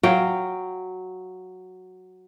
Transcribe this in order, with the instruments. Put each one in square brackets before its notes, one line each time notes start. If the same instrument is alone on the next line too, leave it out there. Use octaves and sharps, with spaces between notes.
[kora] F#3 F5 G5